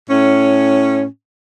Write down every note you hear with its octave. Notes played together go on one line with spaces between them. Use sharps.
A2 C#4